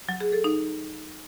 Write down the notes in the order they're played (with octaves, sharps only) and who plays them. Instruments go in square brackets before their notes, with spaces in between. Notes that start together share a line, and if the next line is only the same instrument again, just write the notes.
[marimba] F#3
G#4
A4
D#4